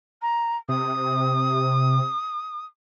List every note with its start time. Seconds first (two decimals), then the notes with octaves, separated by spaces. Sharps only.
0.21 A#5
0.69 C3 D#6